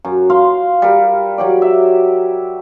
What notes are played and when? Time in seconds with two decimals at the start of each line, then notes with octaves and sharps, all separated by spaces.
0.05 F#2
0.30 F4 F5 C6
0.82 G3 A#4
1.38 F#3 G4 D5
1.62 E5